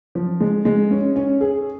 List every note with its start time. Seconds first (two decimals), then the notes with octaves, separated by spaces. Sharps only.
0.15 F3
0.40 G#3
0.65 G#3
0.91 C#4
1.16 C#4
1.41 G#4